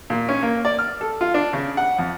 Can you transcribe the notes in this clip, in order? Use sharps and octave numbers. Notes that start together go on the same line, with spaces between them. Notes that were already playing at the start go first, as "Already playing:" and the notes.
A#2
C#4
A#3
D5
F6
A4
F4
D4
C#3
F#5
F2